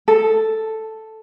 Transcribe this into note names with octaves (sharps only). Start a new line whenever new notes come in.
A4